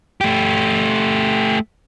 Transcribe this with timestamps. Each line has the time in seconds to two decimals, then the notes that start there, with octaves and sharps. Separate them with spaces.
0.21 A3 G4